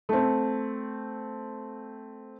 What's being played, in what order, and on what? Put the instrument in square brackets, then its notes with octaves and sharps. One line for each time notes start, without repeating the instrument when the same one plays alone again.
[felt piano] A3 C4